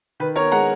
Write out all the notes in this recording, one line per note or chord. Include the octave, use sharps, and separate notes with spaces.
D#3 B4
B3 A#4 C#5
G#3 F#5 A#5